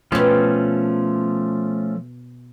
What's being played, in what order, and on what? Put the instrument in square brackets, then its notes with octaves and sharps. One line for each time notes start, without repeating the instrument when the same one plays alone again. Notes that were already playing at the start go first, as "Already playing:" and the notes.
[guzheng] B2 G4 [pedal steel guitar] F3 A3 C#4